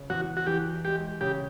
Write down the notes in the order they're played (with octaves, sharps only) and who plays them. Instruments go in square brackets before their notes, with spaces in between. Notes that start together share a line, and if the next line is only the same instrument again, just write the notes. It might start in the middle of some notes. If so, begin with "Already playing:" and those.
Already playing: [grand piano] C#3
[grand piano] E2 [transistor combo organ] F#4
[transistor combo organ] F#4
[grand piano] E3 [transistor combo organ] G4
[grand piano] G#3 [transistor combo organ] G4
[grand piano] C#3 [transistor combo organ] G4